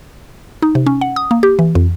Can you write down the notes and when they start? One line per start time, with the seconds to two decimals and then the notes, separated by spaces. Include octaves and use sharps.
0.62 D#4
0.75 C3
0.86 C#4
1.01 F#5
1.16 D#6
1.31 A#3
1.43 G4
1.59 E3
1.75 F2